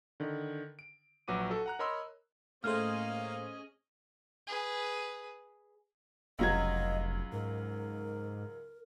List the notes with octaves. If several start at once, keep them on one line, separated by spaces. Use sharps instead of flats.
D3 D#3
D7
A#1 F#3 F#4 B4 D6 D#7
F#4 A4
F#5 A#5 F#6
A#4 C#5 D#5 B5 C6 E6
A2 A3 A#3 C#4 G#4 C5 D#5 F6
G#4 B4
F1 C#2 F#3 D#5 G#6
G#2 A#4